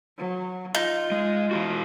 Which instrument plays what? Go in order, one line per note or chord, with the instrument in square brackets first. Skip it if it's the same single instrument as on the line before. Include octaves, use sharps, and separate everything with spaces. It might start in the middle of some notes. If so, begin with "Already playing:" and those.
[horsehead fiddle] F#3
[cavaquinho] D#4 [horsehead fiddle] F4
[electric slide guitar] G#3
E3 E4 F#4